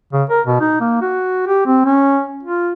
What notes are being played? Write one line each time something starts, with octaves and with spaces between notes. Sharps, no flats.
C#3
A#4
B2
D#4
A#3
F#4
G4
C4
C#4
F4